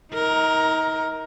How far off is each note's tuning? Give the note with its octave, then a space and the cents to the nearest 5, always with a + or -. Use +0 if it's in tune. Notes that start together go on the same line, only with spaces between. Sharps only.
D#4 +35 A#4 +10